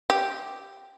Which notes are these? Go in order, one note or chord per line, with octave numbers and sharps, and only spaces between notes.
G4